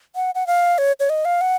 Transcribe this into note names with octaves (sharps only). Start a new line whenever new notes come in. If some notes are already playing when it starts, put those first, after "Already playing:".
F#5
F#5
F5
C#5
C#5
D#5
F5
F#5